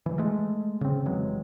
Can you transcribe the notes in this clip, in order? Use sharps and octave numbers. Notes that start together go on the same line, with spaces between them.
E3
G#3 A3
C#3 C4
F1 E3 F#3 G#3